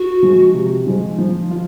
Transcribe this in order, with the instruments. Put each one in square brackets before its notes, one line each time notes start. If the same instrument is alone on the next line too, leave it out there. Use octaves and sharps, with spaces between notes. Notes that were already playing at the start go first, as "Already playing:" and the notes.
Already playing: [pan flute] F#4
[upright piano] F3 G#3
C3
F3 G#3
F3
F4